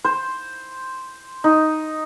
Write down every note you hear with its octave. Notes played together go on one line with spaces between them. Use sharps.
C5
D#4